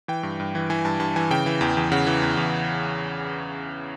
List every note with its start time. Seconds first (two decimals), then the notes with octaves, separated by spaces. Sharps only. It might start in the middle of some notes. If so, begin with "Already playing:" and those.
0.08 E3 G5
0.23 G2
0.40 G2
0.55 E3
0.70 E3 G#5
0.85 G2 A5
1.00 G2 A5
1.16 E3 G#5
1.31 C#3 G5
1.46 E3
1.61 E2
1.77 E2
1.92 C#3 F#5
2.07 E3
2.22 E2
2.37 E2